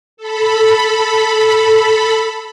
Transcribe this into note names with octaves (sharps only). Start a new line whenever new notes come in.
A4 B5